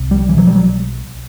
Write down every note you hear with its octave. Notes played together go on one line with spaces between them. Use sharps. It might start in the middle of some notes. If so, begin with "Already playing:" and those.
Already playing: C2 C3
G3
B1 B2 E3
F#3
G3
F#3